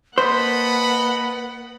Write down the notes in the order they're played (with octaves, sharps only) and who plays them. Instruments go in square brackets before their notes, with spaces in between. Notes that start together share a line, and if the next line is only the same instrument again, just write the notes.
[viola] A#3 F#5 [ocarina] B4 [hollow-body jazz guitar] C5 [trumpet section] D#5 A5 B5